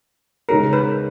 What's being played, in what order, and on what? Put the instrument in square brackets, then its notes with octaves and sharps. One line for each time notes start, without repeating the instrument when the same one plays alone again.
[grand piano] C#3 G#3 D#4 G#4 C#5 [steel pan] A#4
[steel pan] B4